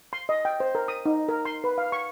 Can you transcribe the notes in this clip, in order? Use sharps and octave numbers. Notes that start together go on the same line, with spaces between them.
C6
D#5
G5
C5
A#4
D#6
D#4
A#4
C6
B4
F5
C#6